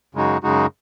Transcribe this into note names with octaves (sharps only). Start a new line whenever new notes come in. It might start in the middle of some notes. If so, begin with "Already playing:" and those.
F#2 C#3 G#3 D#4 F#4
F#2 C#3 G#3 D#4 F#4